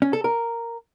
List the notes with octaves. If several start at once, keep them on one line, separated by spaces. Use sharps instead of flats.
C#4
A4
A#4